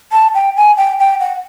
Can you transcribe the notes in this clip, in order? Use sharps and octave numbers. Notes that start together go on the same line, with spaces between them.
A5
G5
G#5
G5
G5
F#5